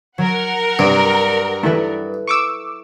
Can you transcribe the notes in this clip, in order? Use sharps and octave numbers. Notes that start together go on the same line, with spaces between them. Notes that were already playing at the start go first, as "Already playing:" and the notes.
F#3 A#4 F#5
G2 C3
E3 A3 E4 A4 B4
C#6 D6 E6